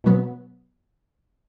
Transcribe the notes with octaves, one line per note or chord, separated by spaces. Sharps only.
B2 F#3 B3